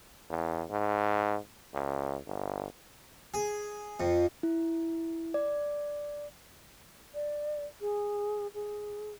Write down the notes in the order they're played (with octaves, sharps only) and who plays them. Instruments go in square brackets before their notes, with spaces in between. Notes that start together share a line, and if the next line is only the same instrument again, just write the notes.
[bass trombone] E2
G#2
C#2
G1
[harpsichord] G#4
F2
[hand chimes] E4
D5
[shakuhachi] D5
G#4
G#4